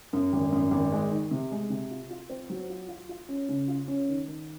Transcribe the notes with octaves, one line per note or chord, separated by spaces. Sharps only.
F#2
G#1
F#2
G#1
G#3
D#3
C3
G#3
C3
F4
F4
C4
F#3
F4
F4
F4
C#4
C#3
F4
C#4
D#3
D#3